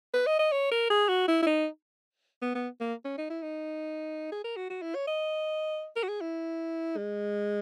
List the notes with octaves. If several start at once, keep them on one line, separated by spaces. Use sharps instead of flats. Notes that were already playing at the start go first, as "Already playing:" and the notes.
B4
D#5
D#5
C#5
A#4
G#4
F#4
E4
E4
D#4
B3
B3
A#3
C#4
D#4
E4
D#4
G#4
A#4
F#4
F#4
E4
C#5
D#5
A#4
F#4
G#4
E4
G#3